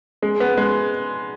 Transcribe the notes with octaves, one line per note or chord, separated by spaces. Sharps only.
G#3
B3
G#3